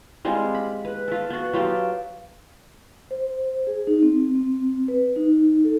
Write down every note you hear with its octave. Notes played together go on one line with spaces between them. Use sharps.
G3 G#3 C4 F4
B5
B4
F4 A4
B3 F#4
F#3 F4 G4 A4
C5
G#4
D#4
C4
C4
B4
D#4
A4